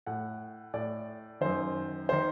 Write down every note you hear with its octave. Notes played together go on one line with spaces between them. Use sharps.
A2 F#5
A2 D5
F#2 D#3 C5
D#3 C5